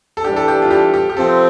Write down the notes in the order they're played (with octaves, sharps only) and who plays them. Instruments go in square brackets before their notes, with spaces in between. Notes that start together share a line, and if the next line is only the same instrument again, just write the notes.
[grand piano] A4
[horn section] E3 G3 D4 [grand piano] G4
[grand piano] A4
G4
F4
G4
G4
G4
[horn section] C3 F3 C4 [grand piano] A4